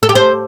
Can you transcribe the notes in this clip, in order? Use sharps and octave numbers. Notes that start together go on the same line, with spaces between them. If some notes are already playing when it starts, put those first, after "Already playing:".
A4
G4
C5